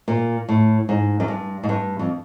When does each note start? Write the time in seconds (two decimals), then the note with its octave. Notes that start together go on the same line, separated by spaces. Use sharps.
0.08 A#2
0.49 A2
0.89 G#2
1.20 F#2
1.28 G2
1.63 G#2
1.69 G2
1.99 F2